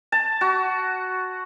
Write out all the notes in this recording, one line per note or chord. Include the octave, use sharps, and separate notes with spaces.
A5
F#4